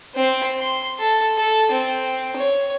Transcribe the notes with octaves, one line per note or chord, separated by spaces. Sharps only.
C4
C6
A4
A4
C4
C#5